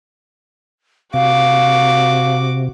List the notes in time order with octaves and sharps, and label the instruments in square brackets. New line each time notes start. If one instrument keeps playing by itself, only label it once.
[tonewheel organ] C3 [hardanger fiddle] F#4 D6 [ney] F5